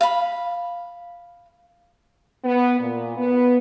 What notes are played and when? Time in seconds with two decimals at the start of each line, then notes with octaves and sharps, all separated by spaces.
0.01 F5 B5
2.44 B3
2.80 A#2
3.17 B3